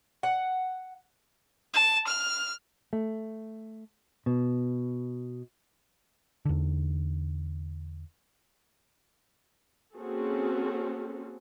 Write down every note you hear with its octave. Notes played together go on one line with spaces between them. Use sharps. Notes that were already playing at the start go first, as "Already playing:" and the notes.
F#5
A5
F6
A3
B2
E2 D3
A#3 C4 C#4 F#4 G#4 A4